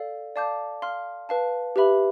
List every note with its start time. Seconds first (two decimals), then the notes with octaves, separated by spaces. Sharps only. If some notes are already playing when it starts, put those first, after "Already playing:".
Already playing: A4 D5 F5
0.36 D5 F5 A5 D6 G6
0.82 F5 C6 F6
1.29 B4 F5 A5
1.76 G4 B4 E5 B5